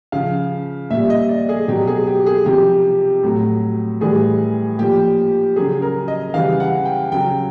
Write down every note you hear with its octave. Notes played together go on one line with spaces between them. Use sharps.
C#3 F3 F5
A#2 G3 E5
D#5
D5
G#4
B2 F#3 G4
G#4
G4
G#4
C3 F3 G4
A2 F#3
A2 E3 G3 G#4
A#2 F3 G4
C#3 F#3 G#4
A#4
D#5
C#3 E3 G3 F5
F#5
G5
C#3 F#3 G5